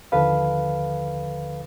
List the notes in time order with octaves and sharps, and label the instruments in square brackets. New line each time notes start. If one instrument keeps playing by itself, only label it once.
[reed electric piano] D#2 D3 F3 A4 B4 F5